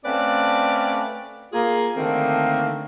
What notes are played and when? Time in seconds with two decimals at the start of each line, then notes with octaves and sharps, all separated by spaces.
0.05 A3 C4 C#4 B4 D5 F5
1.53 A#3 F4 G#4
1.96 D3 D#3 A3 A#3 C4